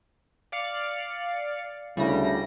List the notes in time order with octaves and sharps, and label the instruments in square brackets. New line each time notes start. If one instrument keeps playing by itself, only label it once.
[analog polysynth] D5 F5 C#7
[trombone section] D2 C#3 E4 [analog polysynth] G3 A#6